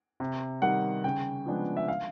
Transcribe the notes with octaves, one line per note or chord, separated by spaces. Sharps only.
C3
D#3 G3 F#5
C#3 G5
F3 G#3 B3 D4
E5
F5